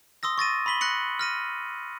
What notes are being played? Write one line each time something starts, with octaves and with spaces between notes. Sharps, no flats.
C6 D#6 E6 A#6
C#6 A6 A#6 D#7
B5 C6 B6 F#7 G7
F#6 A#6 C#7 F#7
F6 A#6 D#7